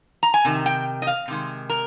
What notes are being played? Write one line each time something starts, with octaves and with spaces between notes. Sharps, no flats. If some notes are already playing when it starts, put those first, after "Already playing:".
A#5
G#5
C3 D#3
G5
D#5
F5
C3 D#3 G#3
A#4